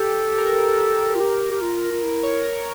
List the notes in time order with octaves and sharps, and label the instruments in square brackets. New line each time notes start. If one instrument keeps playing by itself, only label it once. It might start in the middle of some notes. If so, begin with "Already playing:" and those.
Already playing: [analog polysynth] G4 [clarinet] A4
[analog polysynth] A#4
[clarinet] F4
G4
G4
F4
F4
E4
[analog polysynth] C#5
A#4